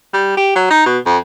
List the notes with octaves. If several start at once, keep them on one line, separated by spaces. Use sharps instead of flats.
G3
G4
F#3
D#4
B2
F2